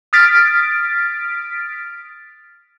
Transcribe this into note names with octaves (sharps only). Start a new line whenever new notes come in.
D#6 F6 A6 B6 D7